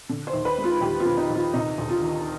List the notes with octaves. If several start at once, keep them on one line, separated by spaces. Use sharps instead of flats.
D3
C5
D#2
B4
G#3
F4
D#2 G4
F4
D3
D#4
D#2
F4
C3 D#4
D2
F4
D#3